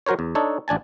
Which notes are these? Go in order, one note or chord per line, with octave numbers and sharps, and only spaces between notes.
F#3 F#4 A#4 C5 C#5
E2
D4 D#4 A4 C#5
A1 D4 G#5 A5